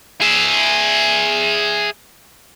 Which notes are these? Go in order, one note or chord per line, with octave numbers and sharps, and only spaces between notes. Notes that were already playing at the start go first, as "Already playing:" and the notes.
G#4 E5